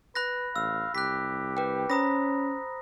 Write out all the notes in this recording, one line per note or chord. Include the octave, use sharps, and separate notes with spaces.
B4 B5 F#6 A#6
A1 F5 E6
C2 G4 F#6 B6
B4 G5
C#4 C5 A#5 B5 D#6 A#6